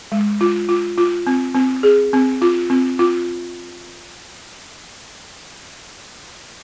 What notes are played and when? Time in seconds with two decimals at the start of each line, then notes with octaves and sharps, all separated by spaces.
0.12 G#3
0.41 F4
0.69 F4
0.98 F4
1.27 C4
1.55 C4
1.83 G#4
2.13 C4
2.42 F4
2.70 C4
2.99 F4